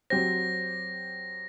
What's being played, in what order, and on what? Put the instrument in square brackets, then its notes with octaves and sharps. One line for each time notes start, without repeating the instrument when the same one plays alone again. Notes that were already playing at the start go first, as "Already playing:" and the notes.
[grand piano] F#3 C4 G4 C5 [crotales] A#6